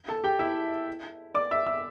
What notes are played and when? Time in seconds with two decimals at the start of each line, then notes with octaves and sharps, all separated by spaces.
0.08 A4 A5
0.24 G4 G5
0.39 E4 E5
1.34 D5 D6
1.51 E5 E6
1.66 E5 E6